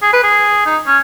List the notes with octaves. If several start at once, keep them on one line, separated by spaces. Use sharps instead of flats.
G#4
B4
G#4
D#4
C#4